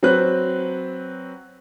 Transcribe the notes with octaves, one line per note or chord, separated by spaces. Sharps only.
F#3 C4 B4 F#6